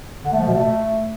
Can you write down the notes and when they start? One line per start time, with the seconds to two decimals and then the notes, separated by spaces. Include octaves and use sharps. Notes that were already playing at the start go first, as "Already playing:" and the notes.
0.25 D3
0.32 A3
0.40 F3
0.47 B2
0.55 A3